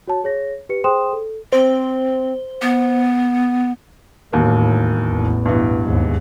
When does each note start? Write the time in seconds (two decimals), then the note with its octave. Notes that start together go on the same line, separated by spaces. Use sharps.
0.08 F#4 C#5 A5
0.24 G#4 C#5 A#6
0.69 G4 B4 C#7
0.84 G#4 C5 G5 C6 D#6 E7
1.13 A4
1.53 C4 C5
2.62 B3
4.32 E1 D#2 A2 A#3
5.07 A1 E2
5.46 G2 B2 E3
5.82 D#2 G#2